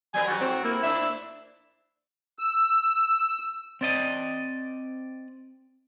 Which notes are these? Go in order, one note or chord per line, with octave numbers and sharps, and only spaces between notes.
F#3 B3 A#4 G#5
F#3 F#4 G4
G#2 C4 C5
A#3 E4
A2 D4 E5
E6
C4 D5 D#5